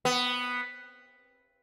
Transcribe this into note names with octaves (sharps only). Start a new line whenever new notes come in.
B3